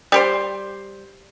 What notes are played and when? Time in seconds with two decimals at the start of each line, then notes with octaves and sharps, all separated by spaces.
0.12 G3 G4 C5